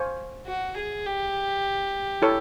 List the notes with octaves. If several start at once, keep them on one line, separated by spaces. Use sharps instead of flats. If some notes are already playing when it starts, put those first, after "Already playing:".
Already playing: C5 F5 G#5 C#6
F#4
G#4
G4
E4 A4 C#5